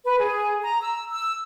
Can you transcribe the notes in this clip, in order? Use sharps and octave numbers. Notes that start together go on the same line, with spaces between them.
B4
G#4
A#5
E6
E6